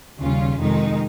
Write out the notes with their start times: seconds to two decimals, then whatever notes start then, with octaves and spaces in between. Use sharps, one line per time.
0.18 D#2 C#3 G3 C#4 F4
0.57 F2 C3 D#3 G#3 D#4